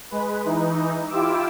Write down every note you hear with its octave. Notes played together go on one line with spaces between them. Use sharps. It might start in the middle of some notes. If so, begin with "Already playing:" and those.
G#3 B4
E3 D#4
E4 F4 G4 D6 E6